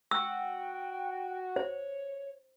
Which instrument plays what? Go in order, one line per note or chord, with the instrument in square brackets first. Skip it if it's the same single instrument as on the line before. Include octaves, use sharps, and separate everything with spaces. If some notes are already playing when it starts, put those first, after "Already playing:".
[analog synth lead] F#4 [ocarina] G5 [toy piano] E6
[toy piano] C5 [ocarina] C#5